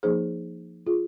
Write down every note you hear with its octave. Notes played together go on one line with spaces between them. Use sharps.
F3 A#3 D#4 G#4 C5
F4 G#4